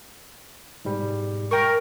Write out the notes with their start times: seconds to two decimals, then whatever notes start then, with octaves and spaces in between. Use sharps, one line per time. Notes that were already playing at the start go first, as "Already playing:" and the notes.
0.85 G#2 B2 G3
1.51 A#4 G5 C#6